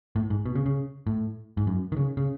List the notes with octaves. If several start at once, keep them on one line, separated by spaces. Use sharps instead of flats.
A2
G#2
B2
C#3
C#3
A2
G#2
F#2
D#3
C#3
C#3